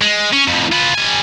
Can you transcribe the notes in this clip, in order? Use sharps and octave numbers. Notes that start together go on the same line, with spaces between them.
G#3
C#4
F2 A2
F4 B4
G3 G#5